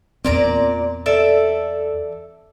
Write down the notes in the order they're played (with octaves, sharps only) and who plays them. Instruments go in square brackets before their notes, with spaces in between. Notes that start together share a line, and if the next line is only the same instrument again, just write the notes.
[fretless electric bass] E2 C4 [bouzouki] A#2 D5 A#5
[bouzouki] A4 D5 E5